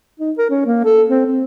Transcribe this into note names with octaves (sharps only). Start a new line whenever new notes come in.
D#4
A#4
C#4
A#3
A4
C4
C4